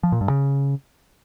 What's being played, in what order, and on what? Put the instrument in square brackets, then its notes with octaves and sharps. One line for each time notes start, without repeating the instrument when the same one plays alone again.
[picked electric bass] F3
A#2
G2
C#3